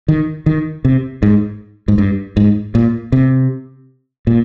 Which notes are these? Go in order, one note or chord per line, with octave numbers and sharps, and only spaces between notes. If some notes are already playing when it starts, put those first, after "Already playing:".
D#3
D#3
C3
G#2
G#2
G2
G#2
A#2
C3
A#2